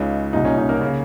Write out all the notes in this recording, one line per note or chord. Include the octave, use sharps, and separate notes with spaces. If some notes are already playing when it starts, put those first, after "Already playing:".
Already playing: C#2 C#3 D#4
C2 A#2 D#4
C#4
D#4
A#3 A#4
C#3